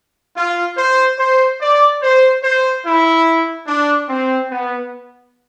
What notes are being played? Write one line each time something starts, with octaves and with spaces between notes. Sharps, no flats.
F4
C5
C5
D5
C5
C5
E4
D4
C4
B3